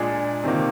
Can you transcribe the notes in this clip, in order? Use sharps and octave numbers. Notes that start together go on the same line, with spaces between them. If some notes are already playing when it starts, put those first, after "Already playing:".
Already playing: A#2 G#3 D4 G#4
C3 D#3 A#3